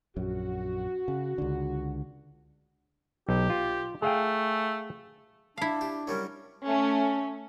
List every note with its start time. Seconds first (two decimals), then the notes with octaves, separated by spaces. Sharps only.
0.16 A#1 F#2 F#4
1.08 C#3
1.38 C#2 D3
3.29 B1 G4
3.50 F4
4.02 A3 G#4 F5 G5
5.58 D4 E4 F5 A5
5.81 G4
6.07 F#3 G3 C#4 A#4
6.65 A3 C#4